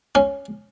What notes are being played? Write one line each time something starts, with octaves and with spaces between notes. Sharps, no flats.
C#4